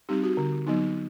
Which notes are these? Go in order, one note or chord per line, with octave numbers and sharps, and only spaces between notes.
G3 C4 D#4 G4
F#4
D3
F#3 B3 D#4